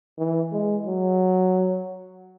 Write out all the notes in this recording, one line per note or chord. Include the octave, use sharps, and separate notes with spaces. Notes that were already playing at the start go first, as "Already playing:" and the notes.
E3
G#3
F#3